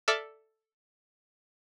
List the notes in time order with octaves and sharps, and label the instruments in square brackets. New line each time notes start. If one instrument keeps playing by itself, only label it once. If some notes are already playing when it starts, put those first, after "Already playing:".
[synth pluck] A4 D5 E5 D6 F6